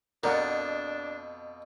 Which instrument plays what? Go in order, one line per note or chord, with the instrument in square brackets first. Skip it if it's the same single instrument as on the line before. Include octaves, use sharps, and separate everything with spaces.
[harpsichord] F2 B2 [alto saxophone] D4 [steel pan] A#4 D5 F#5